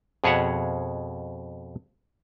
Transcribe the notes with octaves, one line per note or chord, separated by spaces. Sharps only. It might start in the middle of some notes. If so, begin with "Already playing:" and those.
F2 B2 G#4 C#5 E5 F#5